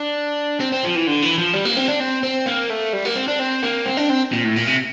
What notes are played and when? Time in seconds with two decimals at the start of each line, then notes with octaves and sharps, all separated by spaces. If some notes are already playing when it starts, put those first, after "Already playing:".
Already playing: D4
0.60 C4
0.72 C4
0.84 F3
0.95 E3
1.07 D3
1.22 E3
1.38 F3
1.53 G3
1.65 A#3
1.77 C4
1.88 D4
2.00 C4
2.23 C4
2.46 A#3
2.70 A3
2.93 G3
3.05 A#3
3.16 C4
3.28 D4
3.39 C4
3.63 A#3
3.86 C4
3.97 D4
4.09 C4
4.32 A#2
4.44 A2
4.56 A#2
4.67 C3